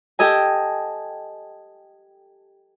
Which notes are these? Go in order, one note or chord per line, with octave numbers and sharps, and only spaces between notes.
G4 A4 D#5 G#5